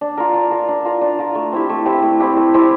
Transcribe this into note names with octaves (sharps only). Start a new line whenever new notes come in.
D4
F4 A#4
D4
F4 A#4
D4
F4 A#4
D4
F4 A#4
A3
C4 E4 G4
A3
C4 E4 G4
A3
C4 E4 G4
A3
C4 E4 G4